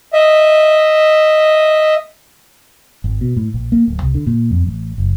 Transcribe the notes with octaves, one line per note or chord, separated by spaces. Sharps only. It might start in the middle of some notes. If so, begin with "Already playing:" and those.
D#5 E5
G#1
B2
A2
A#1
A#3
D1
C2
D3
A#2
F2
A1
F#1